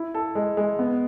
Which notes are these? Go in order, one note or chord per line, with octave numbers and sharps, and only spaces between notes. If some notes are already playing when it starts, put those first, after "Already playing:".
Already playing: E4
A4
G#3
G#3
B3